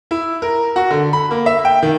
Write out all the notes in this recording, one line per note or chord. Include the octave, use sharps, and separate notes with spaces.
E4
A#4
F#4
D3
B5
A#3
E5
G5
D#3